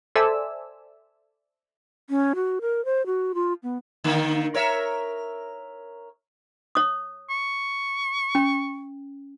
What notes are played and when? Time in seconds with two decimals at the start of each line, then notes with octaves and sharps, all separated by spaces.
0.16 A4 C5 D5 E5 G#5 E6
2.10 C#4
2.35 F#4
2.61 A#4
2.85 C5
3.06 F#4
3.35 F4
3.63 B3
4.04 D3 D#3 A#3
4.54 A#4 C#5 E5
6.75 C#5 D#6
7.30 C#6
8.35 C#4